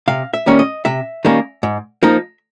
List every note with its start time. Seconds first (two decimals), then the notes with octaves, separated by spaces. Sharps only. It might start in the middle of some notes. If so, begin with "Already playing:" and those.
0.08 C3 F5
0.34 E5
0.46 D#3 G3 A#3 C#4
0.59 D#5
0.85 C3 E5
1.25 D#3 G3 A#3 C#4
1.63 G#2
2.03 F3 A#3 D#4